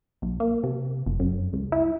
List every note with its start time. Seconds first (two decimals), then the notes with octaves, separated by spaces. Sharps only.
0.22 B1
0.40 A#3
0.63 C3
1.06 F#1
1.19 F#2
1.53 C#2
1.72 E4